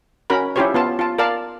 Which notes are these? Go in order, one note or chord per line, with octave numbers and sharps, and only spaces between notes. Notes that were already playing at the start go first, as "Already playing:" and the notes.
C#4 F#4 A#4 A#5 B5
C#4 E4 F4 G4 C5 C#5
B3 F4 A5
F4 A5
A#4 D5 F5 A5